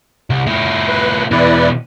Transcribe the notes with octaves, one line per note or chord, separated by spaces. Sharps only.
C2
A#2 E4
B4
B2 E3 E4 B4 D5